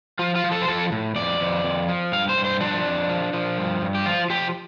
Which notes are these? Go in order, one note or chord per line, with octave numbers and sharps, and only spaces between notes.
F3 F4
F4
F3
A4
C5
F3 A4
A2
F2 D5
F2
F2
F3
G2 F5
C5
G2
C5
F3 D4
F2
F3
F3
G2
G2
G4
F3 F4
F3 G4